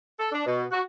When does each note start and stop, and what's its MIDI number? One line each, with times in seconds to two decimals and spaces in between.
0.20 0.29 69
0.32 0.42 62
0.46 0.64 47
0.72 0.81 66